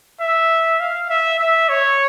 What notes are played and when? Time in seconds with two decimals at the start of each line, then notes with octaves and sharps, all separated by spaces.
0.21 E5
0.80 F5
1.10 E5
1.39 E5
1.69 C#5